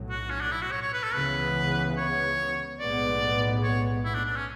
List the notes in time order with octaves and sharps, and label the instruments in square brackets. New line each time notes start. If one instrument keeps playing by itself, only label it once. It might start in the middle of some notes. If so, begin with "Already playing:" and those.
Already playing: [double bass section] B1 A2 F#3
[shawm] F#4
C#4
D4
E4
F#4
C#5
C#5
B4
A4
[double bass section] C#2 C#3 E3 B3 [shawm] B4
[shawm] C#5
[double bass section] B1 A2 G#3 B3 [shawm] D5
[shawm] C#5
E4
D4
D4
C#4